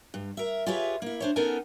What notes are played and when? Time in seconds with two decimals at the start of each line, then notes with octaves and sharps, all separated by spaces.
0.14 G2
0.37 A#4 E5
0.66 F4 G4 G#4 B4 C#5 E5
1.02 A#3 E4
1.20 D4 C5 C#5
1.36 B3 C#4 D#4 A4 A#4 G#5